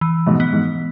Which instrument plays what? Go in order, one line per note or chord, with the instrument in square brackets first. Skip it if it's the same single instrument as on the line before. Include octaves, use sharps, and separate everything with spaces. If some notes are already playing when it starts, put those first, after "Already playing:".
[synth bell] E3
[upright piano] G#2 B2
[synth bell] B3
[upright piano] G#2